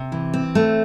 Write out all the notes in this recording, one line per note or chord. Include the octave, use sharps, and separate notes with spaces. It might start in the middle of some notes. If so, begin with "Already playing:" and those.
Already playing: C3
E3
C4
A3